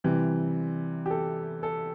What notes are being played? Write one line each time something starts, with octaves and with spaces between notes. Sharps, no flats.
C3 E3 G3
G4
A4
A4